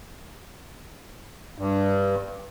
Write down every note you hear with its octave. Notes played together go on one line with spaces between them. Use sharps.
G2